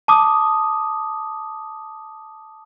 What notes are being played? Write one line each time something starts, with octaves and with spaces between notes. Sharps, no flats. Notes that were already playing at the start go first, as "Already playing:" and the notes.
A5 D6 D#6